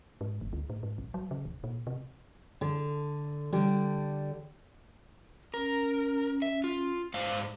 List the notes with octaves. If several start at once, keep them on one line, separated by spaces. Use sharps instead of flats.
G#2
G1
D2
A2
G#2
A#1
F#3
C#3
D1
A#2
C3
D3
D3 G3
C#4 A#4
E5
F4
G#2 C5 D5 F5